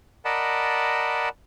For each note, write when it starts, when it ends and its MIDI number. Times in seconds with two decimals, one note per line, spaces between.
0.25 1.29 70
0.25 1.29 74
0.25 1.29 75
0.25 1.29 78
0.25 1.29 81
0.25 1.29 83